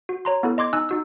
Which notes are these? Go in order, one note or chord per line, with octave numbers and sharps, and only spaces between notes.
F#4
C#5 A#5 C6
B3 E4 A4
D#5 C6 D6 G#6
D#4 D#5 G#5 E6 F#6
D#4 F#4 E6